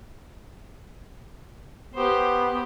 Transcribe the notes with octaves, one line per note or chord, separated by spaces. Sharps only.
B3 G4 C5